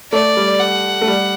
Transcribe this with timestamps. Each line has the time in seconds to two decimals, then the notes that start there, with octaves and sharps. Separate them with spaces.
0.12 A3 D5
0.37 G3
0.60 F#5
1.01 A3
1.07 G3